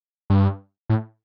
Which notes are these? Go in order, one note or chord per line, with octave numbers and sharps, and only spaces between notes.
G2
A2